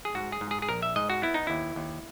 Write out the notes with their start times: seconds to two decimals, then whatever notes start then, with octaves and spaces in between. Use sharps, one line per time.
0.05 G#4
0.15 G#2 F#4
0.32 G#4
0.41 G#2
0.51 G#4
0.62 G#4
0.69 A#1 A#4
0.82 E5
0.96 G#2 D#5
1.10 F#4
1.22 B3 E4
1.34 D#4
1.47 D#2 E4
1.76 D#2